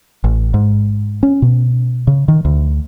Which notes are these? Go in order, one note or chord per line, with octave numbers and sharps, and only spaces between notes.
A1
G#2
C#4
B2
C#3
D#3
D2